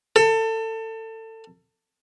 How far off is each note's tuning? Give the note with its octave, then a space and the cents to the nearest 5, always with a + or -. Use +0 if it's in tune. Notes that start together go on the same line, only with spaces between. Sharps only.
A4 +25